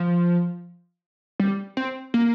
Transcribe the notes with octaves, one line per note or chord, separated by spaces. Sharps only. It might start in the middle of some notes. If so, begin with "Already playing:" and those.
Already playing: F3
G3
C4
A#3